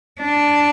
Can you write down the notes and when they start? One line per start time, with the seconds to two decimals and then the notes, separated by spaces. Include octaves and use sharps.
0.21 D4